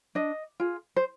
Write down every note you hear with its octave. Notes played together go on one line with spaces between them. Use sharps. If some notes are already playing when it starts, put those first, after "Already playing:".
D4 D#5
F4 G#4
C5